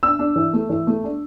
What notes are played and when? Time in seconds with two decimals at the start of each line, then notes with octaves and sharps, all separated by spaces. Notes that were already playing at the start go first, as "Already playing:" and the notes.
0.03 D4 E6
0.19 D4
0.36 E3
0.53 A3
0.70 E3
0.87 A3
1.04 D4